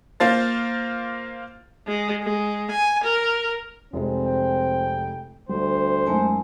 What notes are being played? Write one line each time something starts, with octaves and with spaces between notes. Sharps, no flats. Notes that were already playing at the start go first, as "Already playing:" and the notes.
A#3 F4 C5 A6
G#3
G#3
G#5
A#4
F1 F3 G#3 C4
G5
D2 G3 C5
F#2 G#3 A3 D#4 G#5